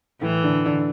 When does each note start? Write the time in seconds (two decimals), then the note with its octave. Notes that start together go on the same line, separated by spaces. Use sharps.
0.21 A2 E3 A3
0.43 D3 D4
0.66 D3 D4